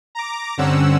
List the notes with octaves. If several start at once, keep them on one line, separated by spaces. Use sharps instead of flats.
A#5 D6
G2 D3 C4 C#4 F#5 E6